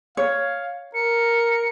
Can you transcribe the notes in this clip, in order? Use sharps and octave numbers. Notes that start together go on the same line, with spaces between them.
C#5 F5
A#4 C#7